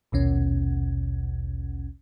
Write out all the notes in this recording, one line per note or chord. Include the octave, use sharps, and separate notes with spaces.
A#1 D#2 B2 C#4